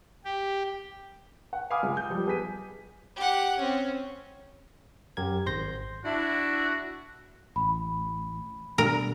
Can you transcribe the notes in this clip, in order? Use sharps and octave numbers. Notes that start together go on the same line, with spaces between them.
G4
F#5
F5 G#5 B5 D6 D#6 F6
C#2
G6
F3 G3
B3 G#4 B4 B6 D#7
G4 F#5
C4 C#4
F#2 G4 A#4 G#6
G#1 C5 C6 G6 A#6
D4 E4 F#4
A1 B5
B2 G3 D4 A#4